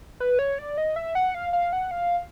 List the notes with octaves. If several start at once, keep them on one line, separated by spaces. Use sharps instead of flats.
B4
C#5
D5
D#5
E5
F#5
F5
F5
F#5
F5